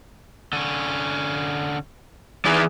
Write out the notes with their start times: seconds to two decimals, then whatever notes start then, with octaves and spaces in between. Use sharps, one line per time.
0.53 D3 C#4
2.45 E3 D#4 G#4 D5 A#5